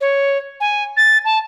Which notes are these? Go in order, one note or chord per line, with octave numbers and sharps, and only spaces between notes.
C#5
G#5
A6
A5